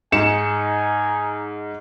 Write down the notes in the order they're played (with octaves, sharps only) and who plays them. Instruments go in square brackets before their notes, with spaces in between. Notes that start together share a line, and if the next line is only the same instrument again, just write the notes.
[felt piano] G#2 C#7 E7 [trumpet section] D#4 G#5